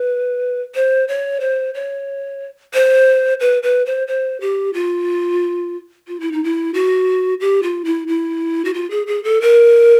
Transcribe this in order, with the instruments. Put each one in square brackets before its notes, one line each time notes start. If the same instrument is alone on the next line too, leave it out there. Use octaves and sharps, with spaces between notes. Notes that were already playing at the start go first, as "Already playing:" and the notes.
Already playing: [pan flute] B4
C5
C#5
C5
C#5
C5
B4
B4
C5
C5
G4
F4
F4
E4
D#4
E4
F#4
G4
F4
E4
E4
F#4
F4
G#4
G#4
A4
A#4